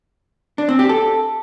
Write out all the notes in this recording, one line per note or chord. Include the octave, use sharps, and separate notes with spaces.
D4
C4
G4
A4